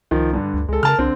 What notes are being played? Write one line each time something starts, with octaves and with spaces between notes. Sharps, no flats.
C2 D#3 F3
G2 D3
D2
C#2 G#3 A4
C#3 A#4 A5 F6
C2 D3 C4